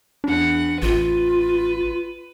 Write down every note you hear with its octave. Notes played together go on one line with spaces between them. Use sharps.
E2 D4 F#5
A1 F4 B4